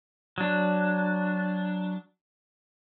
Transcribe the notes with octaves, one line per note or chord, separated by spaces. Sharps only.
F#3 D4